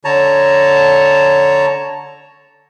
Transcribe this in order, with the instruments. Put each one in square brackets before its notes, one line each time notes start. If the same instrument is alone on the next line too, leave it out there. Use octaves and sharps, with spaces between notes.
[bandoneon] D3 C#5 A5 A#5